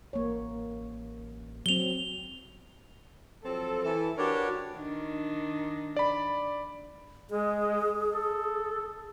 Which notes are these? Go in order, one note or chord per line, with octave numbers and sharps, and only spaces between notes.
A1 A#3 C#5
F#3 C4 F7 G7
F3 F#3 C4 A4
E3 A4
D4 F#4 G4 A#4 B4 C#5
D#3 D4
D5 B5
G#3 G#4
A4